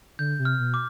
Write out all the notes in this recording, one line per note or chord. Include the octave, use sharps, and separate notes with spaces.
D3 G6
C3
F6
B2
D6